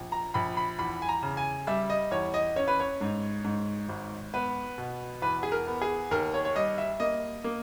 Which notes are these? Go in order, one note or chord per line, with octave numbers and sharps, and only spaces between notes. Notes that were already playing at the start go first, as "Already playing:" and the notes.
Already playing: A#1
A#5
A#1 B5
B5
E2 B5
G#5
A#5
C#3
G#5
G3 E5
D#5
E2 C#5
D#5
C#4 C#5
B4
C#5
G#2
G#2
G#1
B3 B4
B2
E2 B4
G#4
A#4
B3
G#4
D#2 A#4
C#5
C#5
G3 D#5
E5
A#3 D#5
A#3